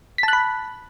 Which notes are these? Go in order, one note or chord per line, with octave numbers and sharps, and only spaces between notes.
A5 B5 F#6 B6